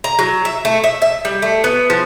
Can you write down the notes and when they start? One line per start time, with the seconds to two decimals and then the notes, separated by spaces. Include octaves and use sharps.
0.04 A#5
0.19 F#3
0.45 E5
0.65 A3
0.84 E5
1.02 E5
1.25 G3
1.42 A3
1.64 B3
1.90 F3